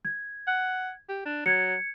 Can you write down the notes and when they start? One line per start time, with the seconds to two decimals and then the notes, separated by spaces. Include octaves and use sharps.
0.05 G#6
0.48 F#5
1.09 G4
1.26 D4
1.46 F#3 G#6 C#7